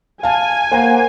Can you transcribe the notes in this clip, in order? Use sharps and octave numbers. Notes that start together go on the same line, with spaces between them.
F5 G#5 A5
A#3 C5 F#5 A#5